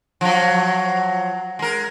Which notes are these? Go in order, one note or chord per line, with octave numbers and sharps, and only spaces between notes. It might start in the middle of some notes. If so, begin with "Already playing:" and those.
F3 F#3
G#3 A#4